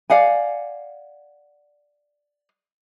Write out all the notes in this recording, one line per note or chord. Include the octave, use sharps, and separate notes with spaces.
D5 F5 F#5 G#5